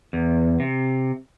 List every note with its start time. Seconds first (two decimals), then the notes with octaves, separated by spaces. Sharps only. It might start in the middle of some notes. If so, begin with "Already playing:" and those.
0.13 E2
0.60 C3